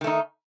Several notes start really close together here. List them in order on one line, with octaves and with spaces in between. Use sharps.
D#3 A3 D#4